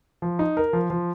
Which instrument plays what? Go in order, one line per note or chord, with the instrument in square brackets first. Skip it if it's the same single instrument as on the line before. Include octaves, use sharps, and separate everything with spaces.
[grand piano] F3
D#4
A#4
F3
F3